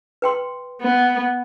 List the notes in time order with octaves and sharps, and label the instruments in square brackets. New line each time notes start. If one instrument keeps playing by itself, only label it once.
[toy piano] B4 G5 C6
[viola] B3